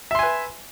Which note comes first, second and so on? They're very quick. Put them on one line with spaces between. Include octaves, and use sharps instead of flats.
E5 C6 G#5 B4